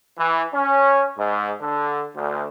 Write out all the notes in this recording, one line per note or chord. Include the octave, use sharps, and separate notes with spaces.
E3
C#4
G#2
D3
D2